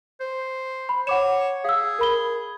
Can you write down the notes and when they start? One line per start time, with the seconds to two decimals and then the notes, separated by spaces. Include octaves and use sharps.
0.20 C5
0.89 B5
1.07 C#5 F#5 D6 E7
1.65 G#4 F5 E6
1.99 A#4 B5 G7